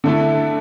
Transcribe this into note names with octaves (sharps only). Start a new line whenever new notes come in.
D3 A3 E4 A4